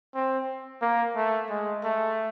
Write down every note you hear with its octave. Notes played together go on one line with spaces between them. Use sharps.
C4
A#3
A3
G#3
A3